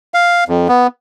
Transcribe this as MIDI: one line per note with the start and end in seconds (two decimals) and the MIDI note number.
0.14 0.44 77
0.48 0.68 41
0.69 0.87 59